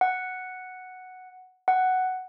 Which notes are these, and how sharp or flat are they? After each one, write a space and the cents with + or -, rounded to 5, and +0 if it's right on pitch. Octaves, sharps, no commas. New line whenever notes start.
F#5 +0
F#5 +5